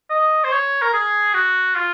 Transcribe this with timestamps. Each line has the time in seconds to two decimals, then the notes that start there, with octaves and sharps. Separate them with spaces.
0.10 D#5
0.44 C5
0.52 C#5
0.82 A#4
0.93 G#4
1.34 F#4
1.75 F4